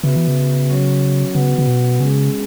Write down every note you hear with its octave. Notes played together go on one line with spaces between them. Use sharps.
C#3 B3 F#4 B4 E5
E3
C#3
F#3 C#4 F#4 C#5
C#3 B3 F#4 B4 F#5
C#3
B2
C#3 G#3 C#4 G#4